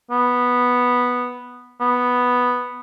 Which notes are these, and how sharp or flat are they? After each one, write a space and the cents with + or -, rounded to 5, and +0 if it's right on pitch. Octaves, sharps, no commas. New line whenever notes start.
B3 -5
B3 +0